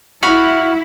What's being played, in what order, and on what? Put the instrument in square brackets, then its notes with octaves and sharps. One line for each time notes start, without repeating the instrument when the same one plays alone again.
[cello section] E4 [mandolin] F#4 F5 B5